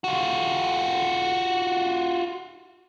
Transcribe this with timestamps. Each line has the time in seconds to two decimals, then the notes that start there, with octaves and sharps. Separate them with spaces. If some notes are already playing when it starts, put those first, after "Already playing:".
0.04 F4 F#4